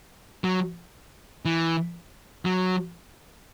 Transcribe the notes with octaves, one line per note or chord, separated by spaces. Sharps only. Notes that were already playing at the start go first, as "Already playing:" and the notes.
F#3
E3
F#3